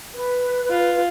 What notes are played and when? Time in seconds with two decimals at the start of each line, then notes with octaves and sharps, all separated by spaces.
0.14 B4
0.70 F4